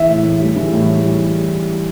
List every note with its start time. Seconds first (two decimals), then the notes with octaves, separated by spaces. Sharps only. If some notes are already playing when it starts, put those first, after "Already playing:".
Already playing: E3 E5
0.08 A2
0.25 A2
0.41 G3
0.56 E3
0.73 A2
0.89 A2
1.05 G3